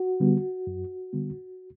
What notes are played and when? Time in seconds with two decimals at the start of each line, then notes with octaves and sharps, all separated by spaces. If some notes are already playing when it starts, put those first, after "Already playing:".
Already playing: F#4
0.20 D3 G3 B3
0.67 F#2
1.13 D3 G3 B3